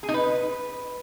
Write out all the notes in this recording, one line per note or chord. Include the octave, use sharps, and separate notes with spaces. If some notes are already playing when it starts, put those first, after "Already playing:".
G#4
D#4
B4